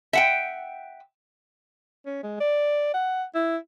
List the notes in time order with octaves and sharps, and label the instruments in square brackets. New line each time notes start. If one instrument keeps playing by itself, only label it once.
[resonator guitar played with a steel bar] E5 F#5 G5
[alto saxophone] C#4
G#3
D5
F#5
E4